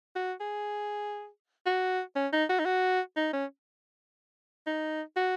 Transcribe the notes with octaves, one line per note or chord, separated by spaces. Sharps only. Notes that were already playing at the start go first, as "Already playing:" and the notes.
F#4
G#4
F#4
C#4
D#4
F#4
D#4
F#4
D#4
C#4
D#4
F#4